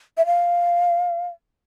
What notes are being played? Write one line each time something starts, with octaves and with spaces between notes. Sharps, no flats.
E5
F5